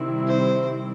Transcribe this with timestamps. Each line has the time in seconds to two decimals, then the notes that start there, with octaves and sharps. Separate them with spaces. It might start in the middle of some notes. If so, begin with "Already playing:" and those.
Already playing: C3 D#3 G3 C4 E4
0.27 C5